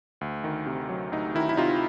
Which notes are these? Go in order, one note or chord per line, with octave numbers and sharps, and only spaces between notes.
D2
D#3
C3
F#3
D2 D#4
D#3 E4
E4
C3 D#4 F4